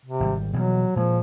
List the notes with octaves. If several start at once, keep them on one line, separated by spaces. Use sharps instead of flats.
C3
G#1 D#3 G3
B2 E3 F#3 G3
A#2 F3 G#3